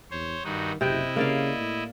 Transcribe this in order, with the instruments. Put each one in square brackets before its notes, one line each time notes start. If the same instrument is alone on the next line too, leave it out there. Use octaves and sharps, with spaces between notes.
[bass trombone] E2 [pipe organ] C5 C#5
[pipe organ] G2 D#4 F#4 [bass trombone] D#3
[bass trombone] F#1 [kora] C3 G5 [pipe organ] E4 D#5
[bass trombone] C#3 [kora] A#3 D5 F5
[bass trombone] A2